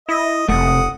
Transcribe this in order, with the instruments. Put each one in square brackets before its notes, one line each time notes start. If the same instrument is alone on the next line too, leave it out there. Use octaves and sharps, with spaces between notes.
[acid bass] E4 [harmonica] D#5
[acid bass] F1 [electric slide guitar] C3 A3 [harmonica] F#5 D#6